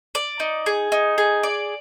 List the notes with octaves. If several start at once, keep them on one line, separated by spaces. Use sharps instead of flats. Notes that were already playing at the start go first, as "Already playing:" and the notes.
D5
D#4
G#4
D#4
G#4
D5